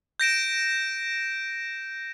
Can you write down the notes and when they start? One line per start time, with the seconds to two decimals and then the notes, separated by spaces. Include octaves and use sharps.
0.20 G6 A#6 D7 E7